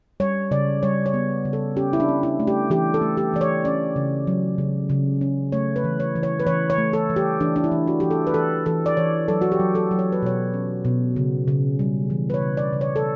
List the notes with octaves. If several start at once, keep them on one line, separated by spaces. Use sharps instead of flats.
G3 C#5
C#3 D5
G3 C#5
C#5
B3
C#3
A4
C#4 G4
E4
D4
C#4
E4
A3
G4
E3 G4
A4
A3
G4
E3 D5
C#5
C#4 D5
C#3
F#3
C#3
C#3
C#4
A3 C#5
B4
E3
C#5
E3
C#5
B4
E3 C#5
C#5
A3
A4
E3
G4
E3 D4
D4
E4
E3
F#4
E3 G4
A4
B4
E3 A4
E3 A4
D5
E3 C#5
F#3 A4
F#4
G4
F#3
A4
F#3
C#5
B4
B2 C#5
C#4
B2
C#3
C#3
G3
E3
B4
C#5
C#3
D5
C#3
C#5
A4